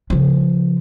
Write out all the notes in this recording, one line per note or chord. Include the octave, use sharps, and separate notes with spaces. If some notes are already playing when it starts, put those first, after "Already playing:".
C#3 F3